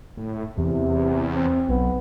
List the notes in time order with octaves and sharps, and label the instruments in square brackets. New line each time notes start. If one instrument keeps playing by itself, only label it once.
[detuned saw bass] A2
[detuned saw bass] E2 [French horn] C3
[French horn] C4
[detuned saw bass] B1 [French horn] B3